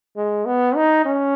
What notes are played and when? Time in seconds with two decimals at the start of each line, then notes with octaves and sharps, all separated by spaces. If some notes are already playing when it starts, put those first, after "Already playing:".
0.16 G#3
0.46 B3
0.76 D#4
1.06 C#4